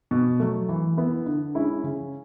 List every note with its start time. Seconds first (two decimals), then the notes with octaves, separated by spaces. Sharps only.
0.11 B2
0.40 F#3 A3
0.69 E3
0.97 B3 E4
1.26 D3
1.54 G#3 C#4 E4
1.84 C#3